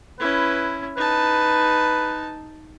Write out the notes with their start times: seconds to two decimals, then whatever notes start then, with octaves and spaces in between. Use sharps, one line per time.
0.19 C#4 E4 B4
0.97 D#4 B4 A5